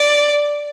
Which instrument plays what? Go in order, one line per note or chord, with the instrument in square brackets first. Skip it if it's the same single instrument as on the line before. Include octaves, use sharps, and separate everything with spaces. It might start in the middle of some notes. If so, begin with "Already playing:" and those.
Already playing: [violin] D5